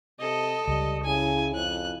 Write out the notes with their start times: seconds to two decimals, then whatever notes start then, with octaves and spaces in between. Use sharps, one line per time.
0.20 C3 A4 D#5
0.67 C#2 G3 D#5
1.05 C#3 E4 G#5
1.55 F2 F#6